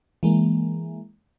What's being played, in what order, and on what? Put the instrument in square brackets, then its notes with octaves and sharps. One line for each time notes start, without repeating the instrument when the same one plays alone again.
[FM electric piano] E3 G#3 A#3